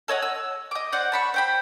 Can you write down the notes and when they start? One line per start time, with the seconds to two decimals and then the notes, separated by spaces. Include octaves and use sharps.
0.08 A4 C#5 D#5 F#5
0.22 E6
0.71 D#5 D6
0.92 C5 D5 F#5
1.12 A5 B5 C#6
1.34 C5 G5 B5